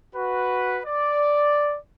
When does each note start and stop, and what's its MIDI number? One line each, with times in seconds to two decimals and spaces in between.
0.15 0.78 66
0.15 0.78 71
0.85 1.76 74